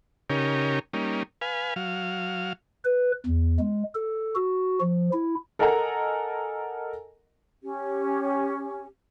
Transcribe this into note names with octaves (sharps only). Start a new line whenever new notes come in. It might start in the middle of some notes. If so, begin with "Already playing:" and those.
C#3 C#4 D#4 G4 A#4
G3 A#3 C#4 D#4
B4 F5 G#5
F#3 F5
B4
E2
G#3
A4
F#4
F3
E4
A4 A#4 D#5 F#5 G#5 A#5
C#4 G4